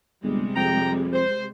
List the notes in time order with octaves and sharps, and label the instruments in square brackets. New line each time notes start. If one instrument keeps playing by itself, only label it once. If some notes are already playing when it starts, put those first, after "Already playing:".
[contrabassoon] G1 [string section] C3 G3 G#3
[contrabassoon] F2 [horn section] G5 A#5
[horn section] C5